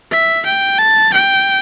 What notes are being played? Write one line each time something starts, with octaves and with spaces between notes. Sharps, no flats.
E5
G5
A5
G5